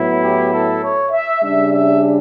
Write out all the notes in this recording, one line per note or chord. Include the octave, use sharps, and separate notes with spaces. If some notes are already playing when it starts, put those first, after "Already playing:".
Already playing: A2 F#3 B3 E4
G4
A4
C#5
E5
C#3 G3 D4 E5
E5